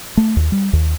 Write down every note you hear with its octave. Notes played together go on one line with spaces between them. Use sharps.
A3
D#2
G3
D#2